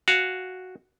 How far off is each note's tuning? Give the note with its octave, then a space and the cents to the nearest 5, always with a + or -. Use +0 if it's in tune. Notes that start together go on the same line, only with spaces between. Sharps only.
F#4 +0 F5 +0 G#5 +10